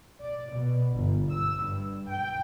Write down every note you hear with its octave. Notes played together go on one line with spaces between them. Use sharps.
D5
B2
G1
E6
G2
G5